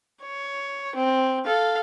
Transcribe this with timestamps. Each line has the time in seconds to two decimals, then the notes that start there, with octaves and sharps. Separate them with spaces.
0.22 C#5
0.96 C4
1.46 A4 F5